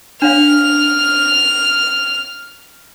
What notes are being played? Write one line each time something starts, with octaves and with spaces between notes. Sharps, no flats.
D4 C#5 F5 F6